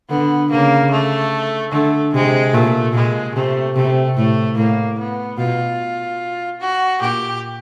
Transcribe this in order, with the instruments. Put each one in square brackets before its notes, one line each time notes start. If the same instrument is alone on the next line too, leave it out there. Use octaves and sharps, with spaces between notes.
[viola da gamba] D3 [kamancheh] B3
[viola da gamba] C#3 [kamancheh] A#3
[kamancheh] A3
[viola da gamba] D3 [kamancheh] A3
[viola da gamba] C3 [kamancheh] G#3
[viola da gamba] A#2 [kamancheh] A3
[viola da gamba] A#2 [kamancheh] G#3
[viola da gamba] C3 [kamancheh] A3
[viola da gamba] C3 [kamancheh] A3
[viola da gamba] A2 [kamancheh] A3
[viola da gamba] A2 [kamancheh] A#3
[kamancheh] B3
[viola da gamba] B2 [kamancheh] F4
[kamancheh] F#4
[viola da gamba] A#2 [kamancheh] G4